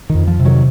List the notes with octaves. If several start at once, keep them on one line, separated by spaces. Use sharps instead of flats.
F2 D#3
F3
C3
D#3 F#3